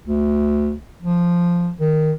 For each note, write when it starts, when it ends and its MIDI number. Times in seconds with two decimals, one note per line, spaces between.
0.07 0.75 38
1.02 1.71 53
1.80 2.13 51